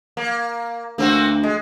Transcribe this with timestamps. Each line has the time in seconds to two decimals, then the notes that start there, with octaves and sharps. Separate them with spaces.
0.17 A#3
0.98 D2 A#3 C4 F#4
1.43 G#3